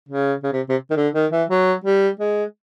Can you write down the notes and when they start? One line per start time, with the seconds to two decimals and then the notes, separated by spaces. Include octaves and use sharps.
0.09 C#3
0.43 C#3
0.52 C3
0.69 C3
0.90 D#3
0.96 D3
1.14 D#3
1.31 E3
1.49 F#3
1.84 G3
2.19 G#3